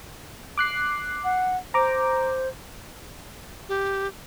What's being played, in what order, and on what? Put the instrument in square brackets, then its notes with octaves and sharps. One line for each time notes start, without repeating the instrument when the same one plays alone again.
[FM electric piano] D6 F#6 C7
[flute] F#5
[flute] C5 [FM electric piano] A#5 D6
[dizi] G4